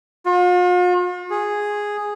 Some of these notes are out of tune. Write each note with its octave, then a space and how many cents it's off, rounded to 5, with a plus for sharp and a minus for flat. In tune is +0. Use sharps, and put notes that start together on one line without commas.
F4 +45
G#4 -5